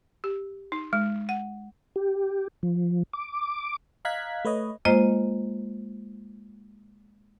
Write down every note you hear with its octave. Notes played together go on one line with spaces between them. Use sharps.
G4
D#4
G#3
F#5
G4
F3
D6
D#5 F5 A#5 F#6 G#6 B6
A3 B4 C#5 D#5
G#3 A#3 F4 C5 D#5